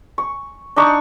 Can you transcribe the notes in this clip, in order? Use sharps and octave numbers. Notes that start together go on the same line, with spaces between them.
C#6
D4 D#4 C#6